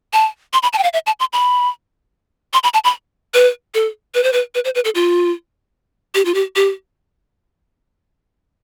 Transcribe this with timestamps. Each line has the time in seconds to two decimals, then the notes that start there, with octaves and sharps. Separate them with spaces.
0.13 A5
0.53 C6
0.63 B5
0.73 A5
0.78 G5
0.83 F5
0.93 E5
1.07 A5
1.20 C6
1.33 B5
2.53 C6
2.63 B5
2.74 A5
2.84 B5
3.34 B4
3.74 A4
4.14 B4
4.23 C5
4.33 B4
4.55 B4
4.65 C5
4.75 B4
4.85 A4
4.95 F4
6.15 G4
6.25 F4
6.34 G4
6.56 G4